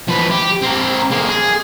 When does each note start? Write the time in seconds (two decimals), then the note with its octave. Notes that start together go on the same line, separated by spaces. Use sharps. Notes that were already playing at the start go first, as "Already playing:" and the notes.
0.08 F3 B4
0.30 G4
0.62 C4 A#4
1.11 G#3 A#3
1.28 G#4